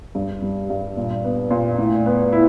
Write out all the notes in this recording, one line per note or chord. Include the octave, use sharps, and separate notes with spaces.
G2
G3
G2
A#2
B3
A#2
A2
B3
E4